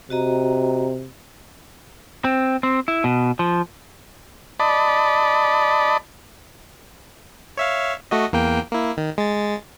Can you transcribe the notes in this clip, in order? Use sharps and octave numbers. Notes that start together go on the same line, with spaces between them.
C3 F#4 D#5 A#5
C4
C4
E4
B2
F3
D5 D#5 A5 B5
C#5 E5 F5
A3 F#4 D#5
E2 A#3 G5
A#3 E4
D#3
G#3 A6